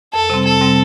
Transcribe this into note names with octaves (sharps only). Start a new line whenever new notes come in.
F2 A4
C3 G3 C4
F2 A4
C3 G3 C4